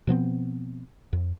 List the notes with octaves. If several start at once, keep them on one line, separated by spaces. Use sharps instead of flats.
B2 F3 B3 C4
F2